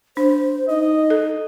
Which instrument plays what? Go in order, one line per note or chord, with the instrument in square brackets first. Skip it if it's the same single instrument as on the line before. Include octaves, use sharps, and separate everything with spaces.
[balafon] D4 [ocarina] C5
[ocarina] D#4 [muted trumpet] D#5
[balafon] A4